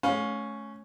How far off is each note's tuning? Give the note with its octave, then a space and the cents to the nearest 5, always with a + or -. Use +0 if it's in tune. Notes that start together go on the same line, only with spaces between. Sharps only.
A3 -30 C#4 +0 F5 +30